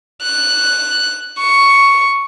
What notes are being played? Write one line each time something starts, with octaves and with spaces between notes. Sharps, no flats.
F#6
C#6